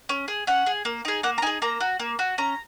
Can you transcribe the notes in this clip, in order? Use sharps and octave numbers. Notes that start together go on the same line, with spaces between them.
C#4
G#4
C#4 F#5
G#4
A#3
D#4 G#4
A#3 F#5
A#5
D#4 G#4 G#5
A#3 A#5
F#4
A#3
F#4
C#4 A#5